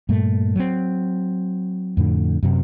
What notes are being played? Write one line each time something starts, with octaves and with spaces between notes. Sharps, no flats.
G2 A#2 A3
F#3 C4
F2 A2 D3
F#2 C3